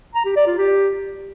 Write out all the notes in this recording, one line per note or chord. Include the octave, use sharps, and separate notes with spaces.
A#5
G4
D5
F4
G4